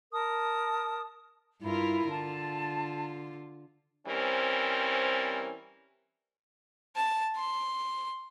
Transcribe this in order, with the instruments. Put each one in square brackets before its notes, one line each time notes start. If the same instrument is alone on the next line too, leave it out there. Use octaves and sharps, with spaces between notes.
[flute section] A#4 A5 D#6
[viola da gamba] G2 F4 A#4 [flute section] E4
[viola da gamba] D3 F4 [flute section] A5
[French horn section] E3 G3 C4 C#4 A#4 C5
[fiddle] A5
C6